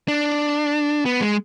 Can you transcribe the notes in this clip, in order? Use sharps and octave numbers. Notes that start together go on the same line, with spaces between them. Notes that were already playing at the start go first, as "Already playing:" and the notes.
D4
B3
G#3